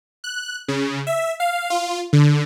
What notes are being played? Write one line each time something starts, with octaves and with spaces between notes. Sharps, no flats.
F#6
C#3
E5
F5
F4
D3